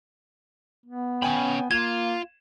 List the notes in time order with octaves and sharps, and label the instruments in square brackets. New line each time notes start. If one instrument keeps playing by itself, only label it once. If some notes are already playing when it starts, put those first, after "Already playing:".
[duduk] B3
[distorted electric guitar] C#4 B5 [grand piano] G5 G#5
[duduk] A#3 [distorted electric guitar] F4 [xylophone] G#6 [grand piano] E7